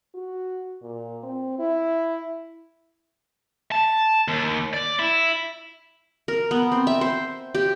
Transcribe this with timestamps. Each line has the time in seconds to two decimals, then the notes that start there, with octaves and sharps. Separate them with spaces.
0.14 F#4
0.82 A#2
1.24 C4
1.59 E4
3.72 A5
4.28 D#2
4.74 D5
4.99 E4
6.28 A#4
6.51 B3
6.72 C4
6.87 E5
7.01 C5
7.55 G4